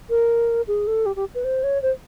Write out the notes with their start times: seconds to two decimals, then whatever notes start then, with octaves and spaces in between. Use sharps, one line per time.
0.10 A#4
0.68 G#4
0.87 A4
1.06 G4
1.16 G4
1.35 B4
1.44 C5
1.63 C#5
1.82 C5